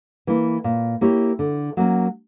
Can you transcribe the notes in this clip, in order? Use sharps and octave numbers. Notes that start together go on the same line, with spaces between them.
E3 A#3 E4
A#2
A#3 E4 G4 C#5
D3
F#3 A#3 C#4